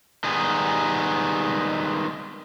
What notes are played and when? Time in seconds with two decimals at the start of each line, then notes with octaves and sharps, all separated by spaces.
0.24 D#3 G3 G#3 B3 D#4